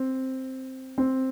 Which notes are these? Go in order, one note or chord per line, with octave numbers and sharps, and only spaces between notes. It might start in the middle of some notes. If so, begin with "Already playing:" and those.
Already playing: C4
C4